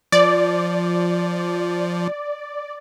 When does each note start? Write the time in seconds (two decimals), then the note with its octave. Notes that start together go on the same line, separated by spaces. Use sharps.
0.12 F3 D5